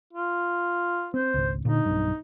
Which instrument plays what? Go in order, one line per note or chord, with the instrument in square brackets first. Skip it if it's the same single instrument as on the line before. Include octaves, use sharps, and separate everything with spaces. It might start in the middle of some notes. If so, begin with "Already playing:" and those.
[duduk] F4
[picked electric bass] C4 [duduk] C5
[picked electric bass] G#1 C#2
[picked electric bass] A#2 D3 [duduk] D#4
[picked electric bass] B1 G2